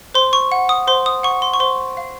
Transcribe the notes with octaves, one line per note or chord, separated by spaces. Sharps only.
C5 C6
C#6
F#5
D#6
C5 C6
D#6
F#5 C#6
C6
C#6
C5 C6
F5